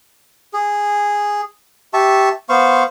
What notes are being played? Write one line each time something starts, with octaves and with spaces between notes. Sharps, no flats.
G#4
G4 E5 A5 C#6
B3 C5 F5 C#6